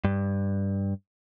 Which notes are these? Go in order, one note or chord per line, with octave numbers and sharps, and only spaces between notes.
G2